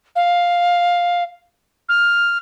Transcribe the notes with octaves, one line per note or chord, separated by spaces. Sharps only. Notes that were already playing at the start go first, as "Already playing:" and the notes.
F5
F6